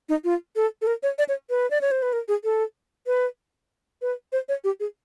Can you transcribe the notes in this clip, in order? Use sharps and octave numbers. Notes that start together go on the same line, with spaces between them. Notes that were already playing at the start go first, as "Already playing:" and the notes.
D#4
F4
A4
A4
A#4
C#5
D5
C#5
B4
D5
C#5
C5
B4
A#4
G#4
A4
B4
B4
C5
C#5
G4
G#4